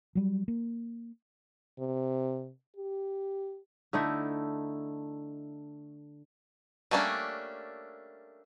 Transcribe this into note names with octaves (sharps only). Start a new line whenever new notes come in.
F#3 G3
A#3
C3
G4
D3 A3 D#4 E4
G3 A3 A#3 C#4 D4